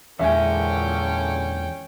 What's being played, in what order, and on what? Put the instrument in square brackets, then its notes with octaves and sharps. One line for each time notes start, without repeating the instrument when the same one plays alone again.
[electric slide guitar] E2 G#3 G#5 [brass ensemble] A#2 D3 [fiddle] C#4 G5 [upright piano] E5